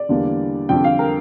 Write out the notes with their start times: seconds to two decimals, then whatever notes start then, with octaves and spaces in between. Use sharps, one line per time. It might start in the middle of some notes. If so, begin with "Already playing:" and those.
Already playing: D5
0.09 E2 D3 G3 A#3
0.69 F2 D3 G3 G5
0.84 F5
0.99 A#4